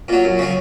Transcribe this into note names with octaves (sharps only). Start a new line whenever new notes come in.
A#2 F#3
F#2
C#3 F#3